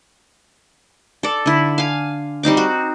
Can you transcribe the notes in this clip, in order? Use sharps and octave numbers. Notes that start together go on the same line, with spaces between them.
A4 D5
D3 E4
F5 G#5
G3 C4 D#4 D6
F#4